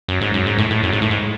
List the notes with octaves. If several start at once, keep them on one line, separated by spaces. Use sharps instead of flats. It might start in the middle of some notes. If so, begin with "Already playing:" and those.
F#2
G#2
F#2
G#2
A2
A2
F#2
G#2
A2
G#2